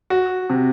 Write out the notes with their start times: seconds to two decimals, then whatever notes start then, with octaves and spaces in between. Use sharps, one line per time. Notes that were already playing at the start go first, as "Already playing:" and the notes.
0.10 F#4
0.50 C3